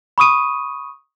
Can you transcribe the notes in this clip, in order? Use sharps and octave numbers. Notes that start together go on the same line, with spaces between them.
B5 C#6 D#6 D#7